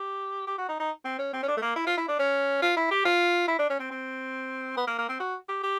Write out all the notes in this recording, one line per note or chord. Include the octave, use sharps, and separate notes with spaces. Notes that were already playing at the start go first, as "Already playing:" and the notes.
Already playing: G4
G4
F#4
D#4
D#4
C4
C#4
C4
C#4
D4
A3
A#3
E4
F4
E4
D4
C#4
F4
E4
G4
F4
E4
D4
C#4
C4
C4
B3
A#3
A#3
C4
F#4
G4
G4